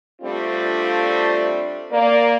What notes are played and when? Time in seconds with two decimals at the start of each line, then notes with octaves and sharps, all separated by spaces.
0.22 G3 A3 C4 D4 F4
1.92 A#3 D5